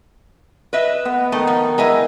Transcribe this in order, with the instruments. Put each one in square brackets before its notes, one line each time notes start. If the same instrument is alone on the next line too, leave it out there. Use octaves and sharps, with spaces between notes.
[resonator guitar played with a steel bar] B4 D#5 E5
[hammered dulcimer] B3
[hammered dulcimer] D#3 D#4 [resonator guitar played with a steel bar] A3
[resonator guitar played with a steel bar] F3
[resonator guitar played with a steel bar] G#3 B4 D#5 [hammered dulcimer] E4 E5